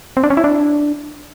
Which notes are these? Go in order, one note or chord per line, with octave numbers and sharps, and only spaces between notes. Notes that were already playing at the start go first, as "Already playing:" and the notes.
C4
D4
C#4
E4
D4